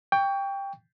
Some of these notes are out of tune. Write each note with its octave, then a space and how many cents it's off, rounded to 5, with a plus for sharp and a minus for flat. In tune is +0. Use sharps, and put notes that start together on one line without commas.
G5 +15 C#6 +30